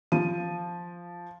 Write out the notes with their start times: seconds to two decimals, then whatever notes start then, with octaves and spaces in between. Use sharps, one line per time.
0.12 F3 D#7